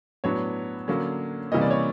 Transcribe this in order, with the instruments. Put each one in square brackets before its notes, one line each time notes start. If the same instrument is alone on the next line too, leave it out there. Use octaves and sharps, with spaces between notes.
[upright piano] A2 F#3 B3 D4 C#5
D3 F#3 A#3 C#4
C3 E3 G3 A#3 C#4 D#5
D5
C#5